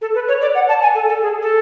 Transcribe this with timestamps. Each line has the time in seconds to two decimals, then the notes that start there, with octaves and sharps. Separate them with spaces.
0.02 A4
0.15 B4
0.28 C#5
0.41 D5
0.55 F#5
0.69 A5
0.82 G#5
0.95 A4
1.09 A4
1.22 G#4
1.42 A4